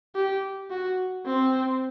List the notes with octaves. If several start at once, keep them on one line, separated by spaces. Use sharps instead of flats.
G4
F#4
C4